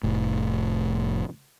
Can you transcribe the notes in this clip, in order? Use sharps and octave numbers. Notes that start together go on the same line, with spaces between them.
F1 A2